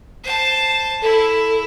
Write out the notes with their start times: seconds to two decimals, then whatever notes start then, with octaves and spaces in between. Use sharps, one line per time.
0.24 C5 A5
1.02 E4 A4